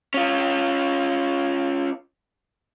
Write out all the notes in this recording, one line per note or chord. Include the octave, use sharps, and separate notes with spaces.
C#4 F4